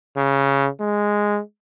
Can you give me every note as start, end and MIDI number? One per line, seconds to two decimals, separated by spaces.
0.17 0.68 49
0.81 1.39 56